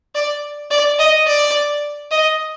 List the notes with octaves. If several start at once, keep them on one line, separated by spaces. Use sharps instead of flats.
D5
D5
D#5
D5
D#5